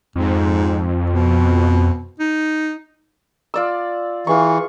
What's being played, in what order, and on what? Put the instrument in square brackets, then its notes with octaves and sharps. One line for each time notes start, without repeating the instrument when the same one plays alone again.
[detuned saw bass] F2 [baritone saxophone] G#2
[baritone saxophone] B2
D#4
[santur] F4 D5 E6
[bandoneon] E3 [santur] F4 G#4 C#6